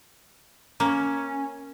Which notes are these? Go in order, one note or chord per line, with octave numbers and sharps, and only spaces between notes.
A#3 C#4